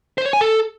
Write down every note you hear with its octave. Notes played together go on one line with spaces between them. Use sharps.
C5
C#5
G#5
A4